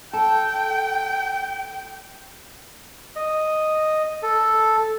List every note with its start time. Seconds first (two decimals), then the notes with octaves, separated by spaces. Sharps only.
0.13 A4 G5 A5
3.16 D#5
4.23 A4